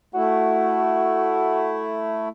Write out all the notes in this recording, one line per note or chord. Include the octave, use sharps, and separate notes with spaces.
A3 E4 F#4